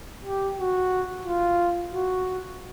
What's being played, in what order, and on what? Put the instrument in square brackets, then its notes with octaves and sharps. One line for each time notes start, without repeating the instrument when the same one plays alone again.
[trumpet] G4
F#4
F4
F#4